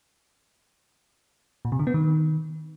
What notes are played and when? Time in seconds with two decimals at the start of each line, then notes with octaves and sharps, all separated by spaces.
1.65 A#2
1.72 C3
1.79 D3
1.87 B3
1.94 D#3